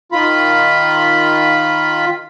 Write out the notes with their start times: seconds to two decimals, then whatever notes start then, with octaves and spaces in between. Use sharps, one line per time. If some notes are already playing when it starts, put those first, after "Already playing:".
0.12 D#3 F4 B5